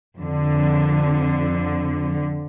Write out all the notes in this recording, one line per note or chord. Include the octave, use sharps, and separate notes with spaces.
F2 D3